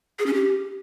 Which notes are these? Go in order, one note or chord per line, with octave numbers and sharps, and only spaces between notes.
G#4
C#4
G4